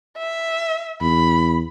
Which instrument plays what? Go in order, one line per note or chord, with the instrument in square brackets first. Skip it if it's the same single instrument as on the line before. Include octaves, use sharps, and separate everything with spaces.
[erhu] E5
[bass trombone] E2 [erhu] B5